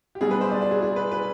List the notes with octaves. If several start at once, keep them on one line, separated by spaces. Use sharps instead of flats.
G4
B1 B2 G3 G#4
B4
C5
D5
D5
G#4
G#4
B4
B4